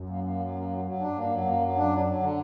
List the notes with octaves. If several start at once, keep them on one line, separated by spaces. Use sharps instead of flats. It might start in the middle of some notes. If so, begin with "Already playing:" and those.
Already playing: F#2
A#3
A#3
F#3
A#3
F#3
F#3
G2 D4
A#3
F#2 F#3
A#3
F#3
D4
F#3
F#3
D3